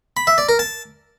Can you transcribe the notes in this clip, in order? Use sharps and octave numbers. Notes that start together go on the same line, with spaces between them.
B5
E5
D5
A#4
A5